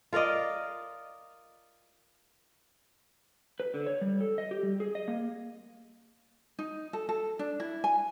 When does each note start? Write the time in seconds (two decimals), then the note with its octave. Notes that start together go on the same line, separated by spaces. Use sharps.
0.13 F4 A#4 D5 D#5
3.60 B4
3.74 D3
3.87 C#5
4.01 G3
4.21 A4
4.38 D#5
4.51 G4
4.63 G3
4.80 G#4
4.95 D#5
5.08 A#3
6.59 D#4
6.93 A4
7.09 A4
7.39 D4
7.60 E4
7.84 G#5